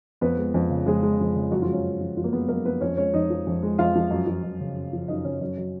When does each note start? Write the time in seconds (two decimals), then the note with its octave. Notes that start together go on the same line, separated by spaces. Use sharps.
0.21 F2 B3 B4
0.38 G#3
0.54 F2
0.70 C#3
0.86 F2 G#3 G#4
1.03 G#3
1.20 F2
1.36 C#3
1.51 F#2 F#3 F#4
1.62 F3 F4
1.67 G#3
1.73 C#4
1.84 F#2
2.01 F3
2.17 F#2 F3 F4
2.24 A#3 A#4
2.33 G#3 B3 B4
2.48 F#2 A#3 A#4
2.65 F3 B3 B4
2.81 F2 C#4 C#5
2.97 G#3 C#4 C#5
3.14 F2 D#4 D#5
3.30 F3
3.47 F2
3.63 G#3
3.78 F2 F4 F5
3.95 F3
4.11 F#2
4.27 F3
4.44 F#2
4.60 C#3
4.76 F#2
4.93 F3
5.08 F#2 D#4 D#5
5.24 C#3 C#4 C#5
5.41 F#2
5.57 F#3